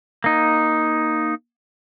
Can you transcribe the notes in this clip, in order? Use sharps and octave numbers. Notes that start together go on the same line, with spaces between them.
A#3 D#4